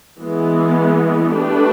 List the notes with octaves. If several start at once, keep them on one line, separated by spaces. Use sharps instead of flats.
E3 G#3 B3
A3 D4 G4 B4